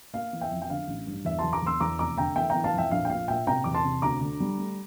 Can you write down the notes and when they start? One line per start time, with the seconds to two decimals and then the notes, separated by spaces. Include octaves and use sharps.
0.14 A#3 F5
0.33 E3
0.41 E5 G5
0.51 F2
0.62 G5
0.70 D3 F5
0.88 A1
1.07 G2
1.25 E2 E5
1.39 A5 C6
1.44 E2
1.53 A#5 D6
1.62 E2 C6 E6
1.80 E2 A#5 D6
1.99 F1 A#5 D6
2.18 D3 G5 A#5
2.36 E3 E5 G5
2.50 E3 G5 A#5
2.64 F5 A5
2.74 F2 E5 G5
2.91 A#1 F5
3.05 G5
3.10 A#2 F5
3.28 A#2 E5 G5
3.47 C3 G5 A#5
3.64 E2 D6
3.74 A5 C6
3.84 C3
4.02 D2 A#5 D6
4.21 D3
4.40 G3
4.58 A3